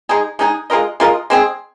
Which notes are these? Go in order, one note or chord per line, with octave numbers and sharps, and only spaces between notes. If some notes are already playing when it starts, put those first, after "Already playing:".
G#3 D#4 G#4
G#3 D#4 G#4
G#3 F4 A#4 D#5
G#3 F4 A#4 D#5
G#3 C4 G#4